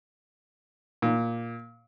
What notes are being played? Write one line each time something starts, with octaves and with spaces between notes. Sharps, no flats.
A#2